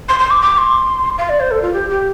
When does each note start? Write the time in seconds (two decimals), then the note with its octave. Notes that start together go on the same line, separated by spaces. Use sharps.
0.09 C6
0.19 C6
0.30 D6
0.41 D6
0.58 C6
1.18 F5
1.29 D5
1.40 C5
1.51 A4
1.62 F4
1.73 G4
1.90 G4